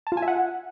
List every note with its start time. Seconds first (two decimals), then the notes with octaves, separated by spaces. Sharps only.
0.07 A5
0.12 F4
0.17 G#5
0.22 E5
0.28 F#5